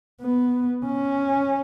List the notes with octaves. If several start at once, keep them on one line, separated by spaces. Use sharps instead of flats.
B3
C#4